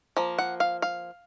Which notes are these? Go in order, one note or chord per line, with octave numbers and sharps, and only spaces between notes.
F3 A#3
F#5
F5
F5